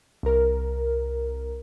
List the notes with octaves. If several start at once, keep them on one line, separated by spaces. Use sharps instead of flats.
C2 A#4